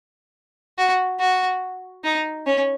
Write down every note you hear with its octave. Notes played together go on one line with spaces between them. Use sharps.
F#4
F#4
D#4
C#4